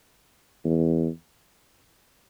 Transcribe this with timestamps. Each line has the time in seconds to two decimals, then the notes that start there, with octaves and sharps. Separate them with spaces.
0.64 E2